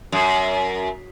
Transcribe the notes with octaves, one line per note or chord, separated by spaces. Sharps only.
F#2